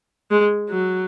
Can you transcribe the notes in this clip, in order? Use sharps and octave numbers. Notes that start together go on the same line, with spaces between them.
G#3
F#3